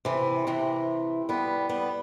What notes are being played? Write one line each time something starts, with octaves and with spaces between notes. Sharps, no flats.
C3 E3
C3 E3
G3 B3
G3 B3